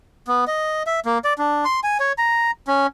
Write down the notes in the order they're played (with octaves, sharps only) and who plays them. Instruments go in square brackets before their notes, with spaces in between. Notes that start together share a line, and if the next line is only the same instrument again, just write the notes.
[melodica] B3
D#5
E5
A#3
D5
D4
C6
G#5
C#5
A#5
C#4